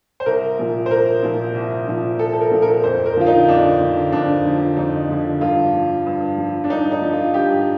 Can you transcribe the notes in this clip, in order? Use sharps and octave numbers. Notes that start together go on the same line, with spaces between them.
C5
C2 A#4
A#2 F3
C5
C2 A#4
A#2 F3
C2
A#2 F3
C2 A4
A4
A#4
A#2 F3
A#4
F2 C5
A#4
D3 F3 F4
D#4
F2 D4
D3 F3
F2 D4
D3 F3
F2 D#4
D3 F3
G2 F4
F3
G2
F3
D4
G2 D#4
D#4
F3
F4
G2 G4